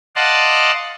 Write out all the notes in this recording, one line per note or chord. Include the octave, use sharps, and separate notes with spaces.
D5 D#5 F5 F#5 A5 C6